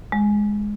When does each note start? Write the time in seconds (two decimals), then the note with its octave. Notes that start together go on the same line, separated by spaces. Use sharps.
0.12 G#3